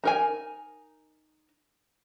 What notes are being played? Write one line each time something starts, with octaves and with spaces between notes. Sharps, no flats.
D#4 A#4 G#5